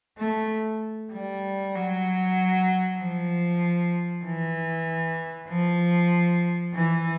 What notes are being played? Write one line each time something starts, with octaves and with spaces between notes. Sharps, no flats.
A3
G3
F#3
F3
E3
F3
E3